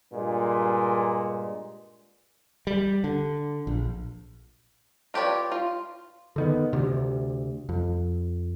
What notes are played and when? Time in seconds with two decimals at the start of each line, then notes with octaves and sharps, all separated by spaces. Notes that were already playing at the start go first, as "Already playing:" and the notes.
0.13 G2 A#2 G#3
2.67 G3
3.04 D3
3.67 A#1
5.14 F4 G4 B4 C#5 D5
5.52 F4
6.36 D3 D#3 B3
6.73 D2 C3
7.69 F2